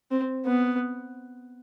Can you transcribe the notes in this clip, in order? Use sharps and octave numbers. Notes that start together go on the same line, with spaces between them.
C4
B3